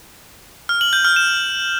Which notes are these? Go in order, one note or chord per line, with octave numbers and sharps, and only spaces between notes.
F6
F#7
G6
F6
E7